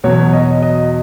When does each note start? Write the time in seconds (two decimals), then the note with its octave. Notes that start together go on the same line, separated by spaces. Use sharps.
0.04 E2 B2 F#3 C#5
0.33 D#5
0.62 D#5